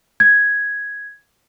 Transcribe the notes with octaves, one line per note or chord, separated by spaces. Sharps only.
G#6